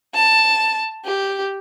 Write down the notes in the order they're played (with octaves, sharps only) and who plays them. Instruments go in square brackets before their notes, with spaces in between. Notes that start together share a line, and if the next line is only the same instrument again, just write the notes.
[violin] A5
G4